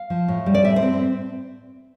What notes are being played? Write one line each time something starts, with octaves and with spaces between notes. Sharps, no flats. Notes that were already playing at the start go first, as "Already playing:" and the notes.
Already playing: F5
F3
A2
G3
D5
A2 E5
C5
C4